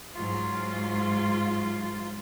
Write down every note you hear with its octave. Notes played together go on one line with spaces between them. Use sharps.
G#2 F#3 F4